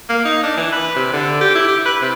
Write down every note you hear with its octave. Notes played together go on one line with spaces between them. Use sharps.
A#3
D#4
D4
E3
B4
C3
D3
G4
E4
G4
B4
C3